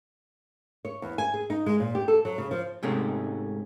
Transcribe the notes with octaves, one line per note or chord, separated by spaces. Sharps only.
C#5
E2
G#5
G#4
D#4
G#3
A#2
G4
A4
F#3
C#3
F3
G#2 C3 G#3 A3 C#4